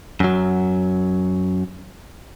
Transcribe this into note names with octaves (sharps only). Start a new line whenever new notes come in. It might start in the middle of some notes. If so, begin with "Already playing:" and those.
F#2 F#3